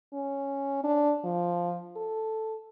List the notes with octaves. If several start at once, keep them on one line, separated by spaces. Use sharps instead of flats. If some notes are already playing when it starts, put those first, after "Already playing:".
C#4
D4
F3
A4